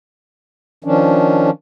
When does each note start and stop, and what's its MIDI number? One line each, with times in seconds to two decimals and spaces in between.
0.84 1.50 51
0.84 1.50 53
0.84 1.50 61
0.84 1.50 62